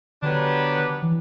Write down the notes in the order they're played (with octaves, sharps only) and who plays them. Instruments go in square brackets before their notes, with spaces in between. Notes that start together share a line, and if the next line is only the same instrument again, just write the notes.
[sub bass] D3 [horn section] F#3 B3 D4 G4 B4
[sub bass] E3